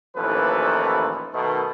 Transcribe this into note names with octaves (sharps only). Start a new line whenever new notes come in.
A1 D#2 E3 F3 A4 B4
B2 D#3 A3